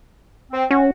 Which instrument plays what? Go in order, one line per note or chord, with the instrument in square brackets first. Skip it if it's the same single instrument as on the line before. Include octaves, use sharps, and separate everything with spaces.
[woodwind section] C4
[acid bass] C#4 [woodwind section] F#4